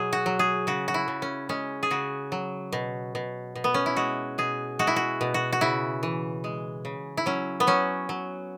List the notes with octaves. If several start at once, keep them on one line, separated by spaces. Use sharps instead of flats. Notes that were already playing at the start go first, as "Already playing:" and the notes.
Already playing: B2 F#3 G#4
F#4
F#3
G#4
C#3 F#4
F#4
E4
C#3
C#4
G#3 C#4
G#4
C#3 F#4
F#3
B2
B2
B2
B3
C#4
E4
G#3 F#4
B2 G#4
G#3 F#4
E4
F#4
B2
F#4
F#4
C#3 E4
E3
G#3
C#3
E4
F#3 C#4
B3
F#3 C#4
F#3